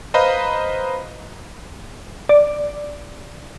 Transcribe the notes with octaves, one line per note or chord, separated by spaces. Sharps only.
B4 C5 D#5 F5 A#5 B5
D5